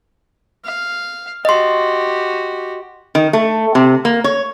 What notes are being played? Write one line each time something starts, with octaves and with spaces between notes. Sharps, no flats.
F5
F#4 G4 D#5 C6
D#3
A3
C3
A#3
C#5